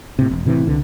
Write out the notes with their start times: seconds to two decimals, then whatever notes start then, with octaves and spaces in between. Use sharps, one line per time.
0.19 A2 C3
0.31 E1
0.46 A2 C3 E3
0.67 C2 D3